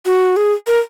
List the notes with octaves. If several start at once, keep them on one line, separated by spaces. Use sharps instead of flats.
F#4
G#4
A#4